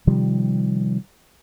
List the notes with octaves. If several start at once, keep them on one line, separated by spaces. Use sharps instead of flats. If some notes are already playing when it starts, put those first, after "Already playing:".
C3 D#3 F3 G3